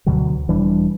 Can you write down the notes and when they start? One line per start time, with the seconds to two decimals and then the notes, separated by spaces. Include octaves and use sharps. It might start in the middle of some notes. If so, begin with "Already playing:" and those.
0.06 D2 B2 D3 F#3
0.48 E1 E3 G3 D4